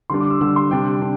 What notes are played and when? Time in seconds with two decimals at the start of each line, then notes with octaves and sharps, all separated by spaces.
0.10 D3 G3 D4 C6
0.21 D6
0.30 E6
0.41 D3 G3 D4 E6
0.56 C6
0.71 C3 G3 D4 G5
1.02 D4